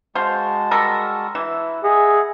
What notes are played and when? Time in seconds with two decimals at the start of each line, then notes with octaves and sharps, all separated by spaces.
0.15 G#3 F#4 C5 F5 A5
0.71 G3 A4 A#4
1.35 E3 E4
1.84 G#4 D#5 E5 F#5